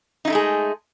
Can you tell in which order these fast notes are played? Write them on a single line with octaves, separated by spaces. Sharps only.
D#4 E4 A3 G#3 G#4